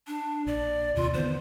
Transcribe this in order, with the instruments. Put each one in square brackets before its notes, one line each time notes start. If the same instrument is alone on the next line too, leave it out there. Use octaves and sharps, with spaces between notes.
[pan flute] D4
[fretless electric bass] A#1 [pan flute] D5
[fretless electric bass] D#2 C3 [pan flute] F4
[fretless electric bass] D3 D#3 B3 [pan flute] C5